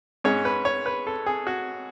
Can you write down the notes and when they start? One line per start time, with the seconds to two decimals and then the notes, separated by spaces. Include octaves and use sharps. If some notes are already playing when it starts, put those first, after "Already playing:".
0.24 G#2 G#3 C#4 C#5
0.45 B4
0.65 C#5
0.86 B4
1.07 A4
1.26 G#4
1.47 F#4